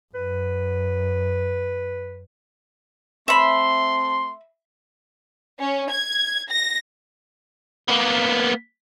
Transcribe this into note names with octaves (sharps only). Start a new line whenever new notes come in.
F#2 B4
A3 C4 E5 B5 C6
C#4
G#6
A#6
A#3 B3